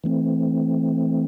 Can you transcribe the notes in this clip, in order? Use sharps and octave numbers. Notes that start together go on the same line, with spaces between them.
E3 A3 C4